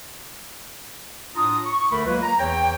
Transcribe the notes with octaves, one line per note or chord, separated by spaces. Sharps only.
A2 D4 F4 A#5 D#6
C#6
D2 D3 A3 A#4 B5
F#3 G#3 A#3 F4 B4
A#5
E2 E3 C#5 G5